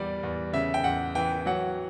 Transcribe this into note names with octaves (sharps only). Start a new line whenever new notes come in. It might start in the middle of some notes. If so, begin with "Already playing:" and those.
Already playing: E2 G3 D5
E2
C#3 E5
G5
E2 F#5
E3 G5
F#3 F#5